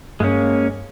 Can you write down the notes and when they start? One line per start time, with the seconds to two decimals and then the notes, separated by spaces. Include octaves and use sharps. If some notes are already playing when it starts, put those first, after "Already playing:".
0.20 G2 G#3 A#3 C#4